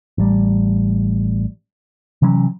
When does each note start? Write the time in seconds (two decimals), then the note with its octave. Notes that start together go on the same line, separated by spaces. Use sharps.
0.18 A1 G3
2.22 C3 E3 F#3 C#4